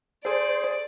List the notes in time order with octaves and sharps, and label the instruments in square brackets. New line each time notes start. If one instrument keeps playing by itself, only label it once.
[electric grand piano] G#4 A4 [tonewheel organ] C5 [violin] D5